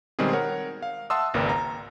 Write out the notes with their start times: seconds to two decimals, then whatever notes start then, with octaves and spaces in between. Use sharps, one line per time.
0.19 B2 D#3 G3 G#3 C4 G#4
0.33 A#4 C#5 F#5
0.83 F5
1.10 E5 F#5 A5 C6 D#6 E6
1.34 G#1 C#2 A#3 A#4 B4 D5
1.49 A#5